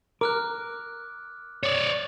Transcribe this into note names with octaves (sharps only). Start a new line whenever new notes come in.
A#4 D6 F6 F#6
C#5 D5 A6